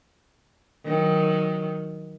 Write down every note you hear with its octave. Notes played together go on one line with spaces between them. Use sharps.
D#3 F#3